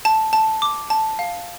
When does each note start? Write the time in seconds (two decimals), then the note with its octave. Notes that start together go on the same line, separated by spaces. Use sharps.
0.05 A5
0.33 A5
0.62 D6
0.90 A5
1.19 F5